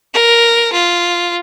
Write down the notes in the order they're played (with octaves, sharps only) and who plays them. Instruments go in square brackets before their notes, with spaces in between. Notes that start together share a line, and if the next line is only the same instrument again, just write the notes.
[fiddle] A#4
F4